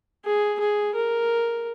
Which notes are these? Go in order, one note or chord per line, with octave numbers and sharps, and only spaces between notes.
G#4
G#4
A#4